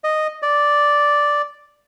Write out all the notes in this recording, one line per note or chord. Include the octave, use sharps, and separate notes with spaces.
D#5
D5